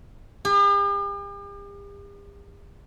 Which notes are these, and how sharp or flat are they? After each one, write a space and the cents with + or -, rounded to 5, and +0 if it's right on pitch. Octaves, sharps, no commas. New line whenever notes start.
G4 +45